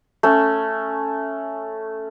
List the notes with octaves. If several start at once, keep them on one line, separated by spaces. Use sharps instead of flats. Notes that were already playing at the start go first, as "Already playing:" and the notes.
A3 C#4